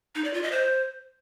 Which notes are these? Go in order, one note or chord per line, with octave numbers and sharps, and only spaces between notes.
D#4
D5
F4
D#5
C5